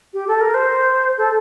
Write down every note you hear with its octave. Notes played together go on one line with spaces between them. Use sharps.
G4
A4
A#4
C5
A4